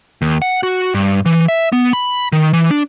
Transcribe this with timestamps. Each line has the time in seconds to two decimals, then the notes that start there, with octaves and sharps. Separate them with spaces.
0.22 D#2
0.42 F#5
0.63 F#4
0.94 G2
1.26 E3
1.48 E5
1.72 B3
1.93 B5
2.32 D#3
2.53 E3
2.71 D4